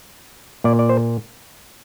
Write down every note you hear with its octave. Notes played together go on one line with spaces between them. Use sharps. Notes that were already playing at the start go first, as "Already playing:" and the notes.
A#2 D5
D5
C5